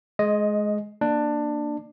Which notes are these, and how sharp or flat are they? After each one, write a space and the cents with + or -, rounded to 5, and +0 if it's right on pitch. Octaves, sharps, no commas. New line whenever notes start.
G#3 +20 D#5 +0
A#3 +0 D4 +15